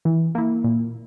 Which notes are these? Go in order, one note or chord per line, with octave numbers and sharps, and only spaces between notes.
E3
A#3 E4
A#2